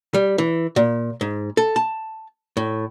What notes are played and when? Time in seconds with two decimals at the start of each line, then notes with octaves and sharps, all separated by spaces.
0.14 G3
0.38 E3
0.76 A#2
1.21 G#2
1.57 A4
1.76 A5
2.57 A2